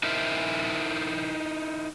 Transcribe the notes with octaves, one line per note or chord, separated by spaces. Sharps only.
D#4 E4 A#4 C5 E5